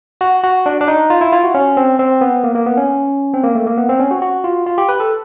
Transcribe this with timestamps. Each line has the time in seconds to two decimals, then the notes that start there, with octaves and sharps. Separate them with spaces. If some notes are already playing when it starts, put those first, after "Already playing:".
0.21 F#4
0.43 F#4
0.66 D4
0.81 D4
0.88 D#4
1.10 F4
1.21 E4
1.33 F4
1.44 F#4
1.54 C#4
1.77 C4
1.99 C4
2.21 B3
2.44 A#3
2.55 A#3
2.66 B3
2.78 C#4
3.33 C4
3.44 A#3
3.55 A3
3.67 A#3
3.77 B3
3.89 C4
4.00 C#4
4.11 F#4
4.22 F#4
4.44 F4
4.66 F4
4.78 G4
4.89 B4
5.00 A4